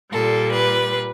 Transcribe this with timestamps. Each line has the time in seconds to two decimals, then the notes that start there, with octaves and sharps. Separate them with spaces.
0.12 A#2 G3 A4
0.53 B4